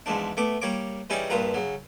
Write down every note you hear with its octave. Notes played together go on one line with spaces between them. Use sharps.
E2 G#2 F3 D4
A3 B3 D6
G3 A#3 C#5 D6
E3 G3 C#4 D#4 G#4 D5
A#1 G2 A#2 F4 B4 A#5
C#3 F#3